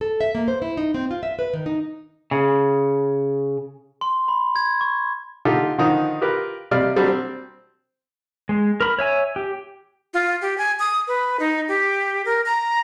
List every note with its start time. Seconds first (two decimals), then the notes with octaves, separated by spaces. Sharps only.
0.01 A4
0.21 E5
0.35 A#3
0.48 C5
0.62 E4
0.77 D#4
0.94 C4
1.11 F4
1.23 E5
1.39 B4
1.53 D#3
1.66 D#4
2.31 C#3
4.01 C6
4.28 B5
4.56 G#6
4.81 C#6
5.45 D3 D#4 F4 G4 A4
5.78 D3 D#3 F3 D#4
6.21 F4 G4 A#4 B4
6.71 C3 G3 D5 D#5 F5 F6
6.96 F#3 G3 C4 D4
7.08 C4
8.49 G#3
8.81 A#4 B5
8.99 C#5 E5 G#5
9.36 G4
10.14 F4
10.42 G4
10.58 G#5
10.79 D#6
11.08 B4
11.40 D#4
11.68 G4
12.25 A#4
12.46 A#5